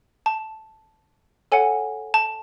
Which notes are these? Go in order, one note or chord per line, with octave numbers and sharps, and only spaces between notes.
A5
A4 C#5 F#5 G#5
A5